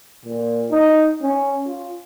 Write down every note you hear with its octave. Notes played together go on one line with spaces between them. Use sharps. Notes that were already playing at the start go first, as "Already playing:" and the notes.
A#2
D#4
C#4
F4